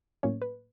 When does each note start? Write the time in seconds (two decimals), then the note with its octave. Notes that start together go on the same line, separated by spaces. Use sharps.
0.23 A2 F#3 A#3 C#4 C#5
0.42 B4